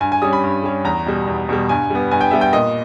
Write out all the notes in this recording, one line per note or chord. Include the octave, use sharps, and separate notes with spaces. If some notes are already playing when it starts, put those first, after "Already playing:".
G2 G#5
G#5
G3 C#4 D#6
B5
G2
G3 C#4
E2 A#5
B2 G3
E2
B2 G3
G2 G#5
G3 B3
G2 G#5
G5
G3 B3 E5
G5
A#2 D#5